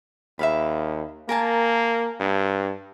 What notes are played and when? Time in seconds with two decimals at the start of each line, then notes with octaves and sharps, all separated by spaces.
0.39 D#2 E5 F5 B5
1.29 A#3 A#4 G#5 A5
2.20 G2